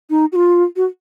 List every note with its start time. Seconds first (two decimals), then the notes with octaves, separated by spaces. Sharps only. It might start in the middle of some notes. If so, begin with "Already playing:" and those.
0.10 D#4
0.32 F#4
0.36 F4
0.76 F#4